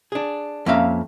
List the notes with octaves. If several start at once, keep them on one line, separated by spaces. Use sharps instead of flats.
D4 G#4
F2 A#3 C#4 E5 F5 A#5